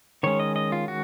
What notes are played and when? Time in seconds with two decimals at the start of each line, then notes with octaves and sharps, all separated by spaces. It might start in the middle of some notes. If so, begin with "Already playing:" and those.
0.23 D#3 G#3 C#4 C#5
0.40 D#5
0.56 D#5
0.72 F4
0.88 F#4